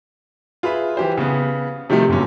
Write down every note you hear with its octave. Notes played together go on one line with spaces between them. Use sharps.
F4 G#4 B4 E5 B5
E3 G4 C5
C#3 B3
C3 D#3 F3 G3 A3
G2 A#2 D3 F#3 C#4